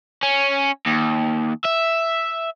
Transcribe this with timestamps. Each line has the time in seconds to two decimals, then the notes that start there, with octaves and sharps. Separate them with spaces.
0.23 C#4
0.86 D#2
1.65 E5